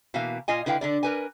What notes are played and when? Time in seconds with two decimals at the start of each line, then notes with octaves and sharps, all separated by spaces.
0.14 B2 E3 A#3 F5
0.48 A#2 F4 D#5 G#5
0.66 D3 E4 B4 F5 G5
0.81 D3 D4 D5
1.03 A#4 B4 G#5